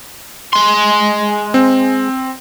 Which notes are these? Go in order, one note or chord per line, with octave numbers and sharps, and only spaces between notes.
G#3 C6
C4